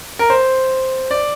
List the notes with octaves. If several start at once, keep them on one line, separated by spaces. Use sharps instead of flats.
A#4
C5
D5